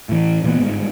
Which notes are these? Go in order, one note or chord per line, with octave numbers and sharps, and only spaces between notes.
A2 E3
A#2 E3 G#3 B3
G1 G#2